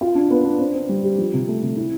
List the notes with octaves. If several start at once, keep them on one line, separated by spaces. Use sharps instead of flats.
F4
D4
B3
D4
C4
C4
G3
G4
F3
C3
A3
C3
E4